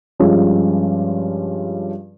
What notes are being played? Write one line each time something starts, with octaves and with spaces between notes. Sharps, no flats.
G2 F3 G#3 C#4 F4